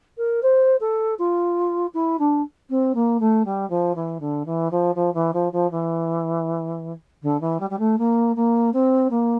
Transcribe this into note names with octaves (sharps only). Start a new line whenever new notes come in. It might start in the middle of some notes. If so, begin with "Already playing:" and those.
A#4
C5
A4
F4
E4
D4
C4
A#3
A3
G3
F3
E3
D3
E3
F3
F3
E3
F3
F3
E3
D3
E3
G3
G3
A3
A#3
A#3
C4
A#3